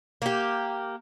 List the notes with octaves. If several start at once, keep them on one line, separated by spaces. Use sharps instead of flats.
A#3 G4